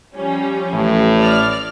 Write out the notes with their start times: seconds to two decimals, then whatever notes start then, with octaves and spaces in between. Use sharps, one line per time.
0.14 F3 G3 C#4
0.73 A1 A2
1.17 D5 F6